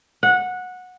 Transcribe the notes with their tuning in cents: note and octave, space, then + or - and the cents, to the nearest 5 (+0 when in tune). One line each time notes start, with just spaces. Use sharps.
F#5 -15